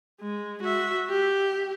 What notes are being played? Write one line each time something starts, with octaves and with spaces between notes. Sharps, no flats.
G#3
F#4 E5
G4